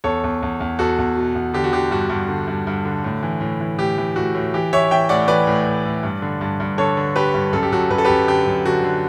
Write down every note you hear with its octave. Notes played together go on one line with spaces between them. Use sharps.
E2 A4 C#5
E2
E2
E2
E2 F#4 A4
E2
B2
E2
D3 G4
F#4
D3 G4
G2 F#4
G2
D3
G2
G2
D3
A2
E3
A2
E3
A2 G4
E3
A2 F#4
A2
E3 G4
E3 C#5 E5
E3 E5 G5
A2 D5 F#5
E3 B4 D5
A2
A2
A2
G2
D3
G2
G2
D3 A4 C#5
D3
D3 G4 B4
G2
F#2 A4
G4
F#2 F#4 A4
F#2 B4
A4
F#2 G4 B4
D3 G4
F#2
D3 F#4
D3